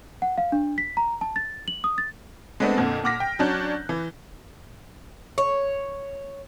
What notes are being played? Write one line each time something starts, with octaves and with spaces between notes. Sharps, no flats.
F#5
F5
D4
B6
A#5
A5
A6
F#7
D#6
A6
G#3 A3 B3 C4 D4
F2 A#2 D3
A#2 F#5 D6 F6 A#6 B6
G5
F#3 C#4 D4 F#6 G6
E3
C#5